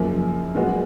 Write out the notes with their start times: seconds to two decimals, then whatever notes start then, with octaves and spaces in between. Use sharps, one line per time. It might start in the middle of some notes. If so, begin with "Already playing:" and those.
Already playing: F#1 F#2 F3 A#3
0.55 A#2 G#3 B3 F#4